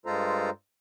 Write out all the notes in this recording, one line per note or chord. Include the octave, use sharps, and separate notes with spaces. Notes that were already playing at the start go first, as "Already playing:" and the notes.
G2 G#3 F4 A4 C5 A#5